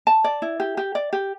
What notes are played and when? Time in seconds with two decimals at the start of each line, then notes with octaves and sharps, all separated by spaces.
0.07 A5
0.24 D5
0.42 E4
0.60 G4
0.77 G4
0.95 D5
1.13 G4